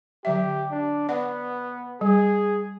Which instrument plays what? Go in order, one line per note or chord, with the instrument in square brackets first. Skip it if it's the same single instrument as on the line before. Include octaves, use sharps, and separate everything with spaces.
[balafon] D3 F#3 E5 [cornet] G4
[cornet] D4
[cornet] B3 [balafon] D5 F#5
[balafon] G3 [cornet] G#4